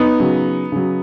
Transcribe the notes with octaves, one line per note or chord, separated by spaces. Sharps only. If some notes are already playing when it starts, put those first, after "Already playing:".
Already playing: B3 D#4
C#3 F#3
C#3 F#3